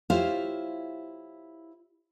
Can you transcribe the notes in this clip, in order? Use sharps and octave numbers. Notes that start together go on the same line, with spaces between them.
E4 F4 G4 C5 C#5 F5